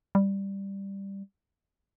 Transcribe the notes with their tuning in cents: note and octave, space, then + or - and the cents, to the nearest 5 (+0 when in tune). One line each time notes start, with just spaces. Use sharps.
G3 +5